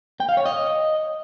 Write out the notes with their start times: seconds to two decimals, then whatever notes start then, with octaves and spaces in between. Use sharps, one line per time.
0.20 G5
0.29 F5
0.37 C#5
0.46 D#5